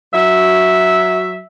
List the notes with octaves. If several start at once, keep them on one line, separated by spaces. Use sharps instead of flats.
F#3 E5